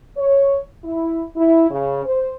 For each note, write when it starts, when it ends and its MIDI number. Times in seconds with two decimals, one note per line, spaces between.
0.17 0.58 73
0.85 1.22 64
1.36 1.68 64
1.71 2.03 49
2.05 2.34 72